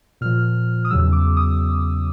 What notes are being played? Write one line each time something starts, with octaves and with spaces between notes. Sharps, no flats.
A#2 F3 F6
D#6
E2 C#3 F#3 E6
D6
D#6